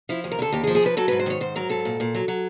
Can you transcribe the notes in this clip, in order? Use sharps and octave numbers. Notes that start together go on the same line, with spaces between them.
F3 E4
D#2
A#4
D3 A4
D#2 G4
G#4
F3
G#4
D#2 B4
F#3 A4
G#2 B4
C5
D#3 C#5
G#2 C5
F#3 A#4
G#2 A4
A#2
A#2
F#3
F#3